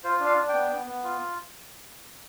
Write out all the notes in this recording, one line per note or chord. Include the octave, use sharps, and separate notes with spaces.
F4 C5
D4
F5
D4
B3 G5
B3
B3
F4